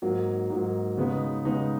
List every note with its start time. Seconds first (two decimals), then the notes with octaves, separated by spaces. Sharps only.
0.02 G#2 F#3 A#3
0.50 G#2 F#3 A#3
0.97 C#3 G#3 B3 D#4
1.45 C#3 G#3 B3 D#4